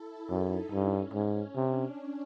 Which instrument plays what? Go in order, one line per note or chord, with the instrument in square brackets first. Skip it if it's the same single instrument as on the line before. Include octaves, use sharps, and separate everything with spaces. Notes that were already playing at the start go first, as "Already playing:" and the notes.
Already playing: [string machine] E4 A4
[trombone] F#2 [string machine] D#4
[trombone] G2 [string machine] C#4
[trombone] G#2
[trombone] C3 [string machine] D4